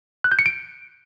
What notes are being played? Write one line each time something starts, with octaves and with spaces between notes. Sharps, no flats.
F#6
G6
C#7
D7